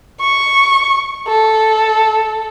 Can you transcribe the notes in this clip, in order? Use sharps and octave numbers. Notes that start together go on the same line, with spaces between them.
C#6
A4